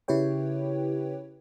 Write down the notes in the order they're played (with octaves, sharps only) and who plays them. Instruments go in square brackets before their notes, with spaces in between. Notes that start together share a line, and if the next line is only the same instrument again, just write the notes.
[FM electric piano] C#3 E4 G4 B4 C#5 G5